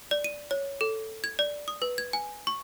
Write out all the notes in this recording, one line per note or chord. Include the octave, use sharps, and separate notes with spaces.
D5
D#7
C#5
A4
G#6
D5
D#6
B4
G#6
G#5
C#6